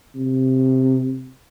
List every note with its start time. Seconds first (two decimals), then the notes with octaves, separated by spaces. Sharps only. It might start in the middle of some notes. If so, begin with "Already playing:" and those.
0.16 C3